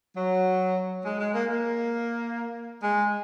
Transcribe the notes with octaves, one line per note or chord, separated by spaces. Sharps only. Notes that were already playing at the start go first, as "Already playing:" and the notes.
F#3
G#3
G#3
A#3
A#3
G#3